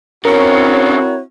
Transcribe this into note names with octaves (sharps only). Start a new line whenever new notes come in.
D3 C4 C#4 E4 F#4 A#4 C#5